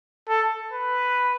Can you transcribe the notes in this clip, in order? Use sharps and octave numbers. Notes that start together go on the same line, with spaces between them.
A4
B4